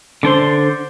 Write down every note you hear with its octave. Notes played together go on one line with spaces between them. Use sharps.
D3 D4 C5 C6